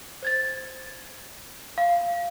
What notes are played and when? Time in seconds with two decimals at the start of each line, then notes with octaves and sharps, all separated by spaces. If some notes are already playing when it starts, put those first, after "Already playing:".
0.23 C5 G#6 A6
1.78 F5